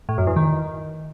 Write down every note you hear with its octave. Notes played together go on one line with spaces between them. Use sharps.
A2
F#2
E2
D#3